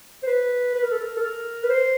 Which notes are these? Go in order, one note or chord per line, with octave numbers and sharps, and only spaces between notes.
C5
B4
B4
A#4
A4
A#4
A4
A#4
B4
C5